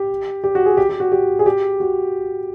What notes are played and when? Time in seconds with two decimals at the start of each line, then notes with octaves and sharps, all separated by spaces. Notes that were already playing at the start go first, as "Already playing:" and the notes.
Already playing: G4
0.44 G4
0.55 F#4
0.66 G#4
0.77 G4
0.89 G4
1.00 F#4
1.12 G4
1.39 G#4
1.46 G4
1.80 F#4